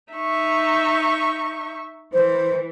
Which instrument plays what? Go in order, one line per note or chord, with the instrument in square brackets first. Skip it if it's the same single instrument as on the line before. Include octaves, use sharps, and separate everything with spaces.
[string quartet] D#4 E5 C#6
[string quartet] E3 [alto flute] C5